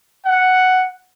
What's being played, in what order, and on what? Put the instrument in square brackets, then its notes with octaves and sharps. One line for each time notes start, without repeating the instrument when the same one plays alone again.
[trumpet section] F#5